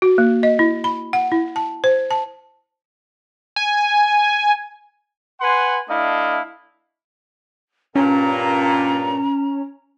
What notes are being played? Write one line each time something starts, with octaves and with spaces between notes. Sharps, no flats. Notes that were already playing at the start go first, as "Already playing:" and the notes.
F#4
A#3
D#5
E4
B5
F#5
E4
A5
C5
A5
G#5
B4 F#5 G#5 C6
A3 D4 E4 D#5 F5
G2 A#2 C#4 A#5